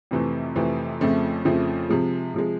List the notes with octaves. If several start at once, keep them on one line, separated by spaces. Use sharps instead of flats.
F2 C3 E3 A3 C4
F2 C3 E3 A3 C4
F2 C#3 F3 A3 C4
F2 C#3 F3 A3 C4
C3 F3 G#3
C3 F3 G#3